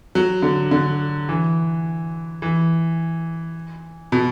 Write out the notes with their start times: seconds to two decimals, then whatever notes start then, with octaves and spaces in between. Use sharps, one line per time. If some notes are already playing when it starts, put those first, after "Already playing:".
0.15 F#3
0.43 D3
0.71 D3
1.29 E3
2.42 E3
4.12 B2